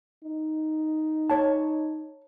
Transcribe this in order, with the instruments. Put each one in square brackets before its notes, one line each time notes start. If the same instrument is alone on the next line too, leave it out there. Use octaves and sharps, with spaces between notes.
[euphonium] D#4
[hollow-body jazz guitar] C#5 A5